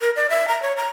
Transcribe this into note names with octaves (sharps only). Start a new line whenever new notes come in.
A#4
D5
E5
A#5
C#5
A#5